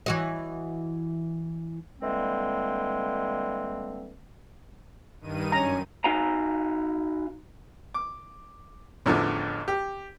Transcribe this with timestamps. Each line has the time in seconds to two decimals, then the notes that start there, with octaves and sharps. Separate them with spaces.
0.06 E3 F#4 D#5
2.01 D3 E3 G3 G#3 A#3 C4
5.21 G2 D#3 D#7
5.52 F#2 C#4 A#5
6.04 D#4 F#4 F5 G#5 A#5
7.94 D6
9.06 A1 E2 D3 F3
9.68 G4